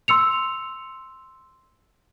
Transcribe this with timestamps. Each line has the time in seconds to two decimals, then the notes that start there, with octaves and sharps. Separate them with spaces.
0.08 C6 E6 C#7 F7